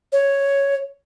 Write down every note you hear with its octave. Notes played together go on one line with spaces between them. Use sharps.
C#5